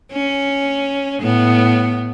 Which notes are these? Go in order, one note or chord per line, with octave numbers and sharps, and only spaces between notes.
C#4
A2 B3